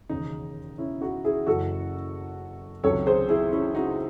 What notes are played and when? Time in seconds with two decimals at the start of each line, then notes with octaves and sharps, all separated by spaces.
0.09 E1 D#2 C#3 G#3 D#4
0.78 C#4 E4
1.01 D#4 F#4
1.24 E4 G#4
1.47 F#1 F#2 E3 F#4 A4
2.83 C#2 C3 D#3 F#3 A4 C#5
3.06 G#4 C5
3.29 E4 G#4
3.52 C#4 E4
3.75 D#4 F#4